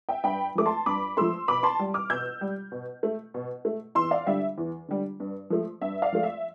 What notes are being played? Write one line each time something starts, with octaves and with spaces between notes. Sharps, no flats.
E5 G5
G2 G5 B5
F3 A3 D6
A5 C6
G2 B5 D6
F3 A3 C6 E6
B2 B5 D6
A5 C6
G3
D6 F6
B2 E6 G6
G3
B2
A3
B2
A3
E2 C6 E6
D5 F5
D3 G3 E5
E2
D3 G3
G2
F3 A3
G2 E5
D5 F5
F3 A3
E5